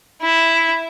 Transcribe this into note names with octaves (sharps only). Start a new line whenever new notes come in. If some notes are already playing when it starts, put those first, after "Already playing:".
E4